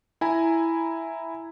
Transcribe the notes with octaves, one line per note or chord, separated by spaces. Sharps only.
E4 G#5 A#5